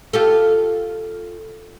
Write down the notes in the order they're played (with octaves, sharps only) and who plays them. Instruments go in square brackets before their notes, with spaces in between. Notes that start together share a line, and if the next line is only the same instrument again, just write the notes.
[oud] F4 G4 A4